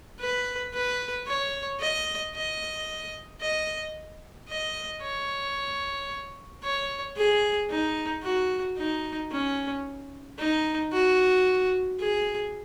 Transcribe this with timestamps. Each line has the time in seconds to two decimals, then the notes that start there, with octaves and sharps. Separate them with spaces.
0.20 B4
0.74 B4
1.27 C#5
1.80 D#5
2.35 D#5
3.41 D#5
4.49 D#5
5.02 C#5
6.63 C#5
7.17 G#4
7.70 D#4
8.23 F#4
8.77 D#4
9.31 C#4
10.38 D#4
10.92 F#4
11.99 G#4